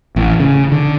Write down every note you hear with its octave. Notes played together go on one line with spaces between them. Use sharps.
A1
C#3
D3